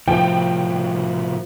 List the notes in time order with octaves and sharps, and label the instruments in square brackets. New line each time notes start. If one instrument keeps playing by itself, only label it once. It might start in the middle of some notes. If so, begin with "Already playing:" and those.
[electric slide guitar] A2 C3 [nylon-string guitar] F3 [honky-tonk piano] G5